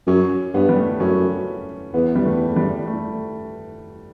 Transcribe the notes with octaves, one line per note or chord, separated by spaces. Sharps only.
F#2 C#4
G2 B3
G3
A3
F#2 C#4
E2 B3
G3
A3
G3
A3